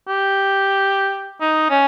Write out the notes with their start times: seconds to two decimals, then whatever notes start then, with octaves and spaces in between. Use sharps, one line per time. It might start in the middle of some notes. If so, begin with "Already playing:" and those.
0.08 G4
1.41 D#4
1.70 C#4